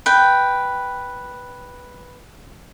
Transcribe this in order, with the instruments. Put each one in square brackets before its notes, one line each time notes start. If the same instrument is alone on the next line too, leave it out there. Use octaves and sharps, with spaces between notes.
[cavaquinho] B4 G5